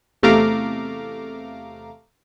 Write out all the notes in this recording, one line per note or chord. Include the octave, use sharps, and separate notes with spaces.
E2 C3 A3 F5 A#5 D6